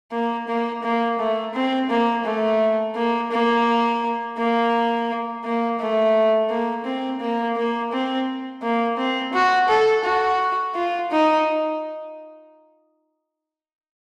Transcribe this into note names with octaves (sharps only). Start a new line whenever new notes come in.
A#3
A#3
A#3
A3
C4
A#3
A3
A#3
A#3
A#3
A#3
A3
A#3
C4
A#3
A#3
C4
A#3
C4
F#4
A4
F#4
F4
D#4